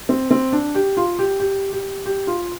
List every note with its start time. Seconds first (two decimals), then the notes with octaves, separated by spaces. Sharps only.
0.09 C4
0.31 C4
0.53 D4
0.75 G4
0.97 F4
1.19 G4
1.40 G4
1.72 G4
2.06 G4
2.27 F4